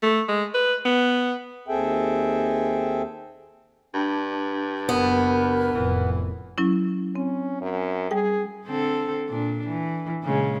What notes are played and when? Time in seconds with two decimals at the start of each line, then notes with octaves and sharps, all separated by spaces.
0.02 A3
0.28 G#3
0.54 B4
0.85 B3
1.68 D#2 C4 G#4 A4 E5 G5
3.94 G2 D4
4.89 F#1 F#2 B3 A#4
5.75 F1 F2 A2 E3
6.58 F#3 C#4 E4
7.15 C4 C#4
7.61 F#2
8.11 G3 G#4 G5
8.66 D3 C4 A4
9.28 A#2 D4
9.67 E3
10.23 A#2 C#3 G#3